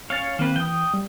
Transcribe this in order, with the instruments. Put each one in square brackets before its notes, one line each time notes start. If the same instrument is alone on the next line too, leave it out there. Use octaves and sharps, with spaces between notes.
[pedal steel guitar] C#4 C#5 F5 [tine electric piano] F6 A6
[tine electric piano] D#3 C4 [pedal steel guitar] A#3 B4
[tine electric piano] E3 [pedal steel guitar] G5 D#6
[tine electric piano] G3